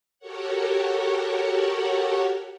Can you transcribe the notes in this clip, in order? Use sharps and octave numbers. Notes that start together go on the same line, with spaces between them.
F#4 G4 A4 A#4 C#5 F#5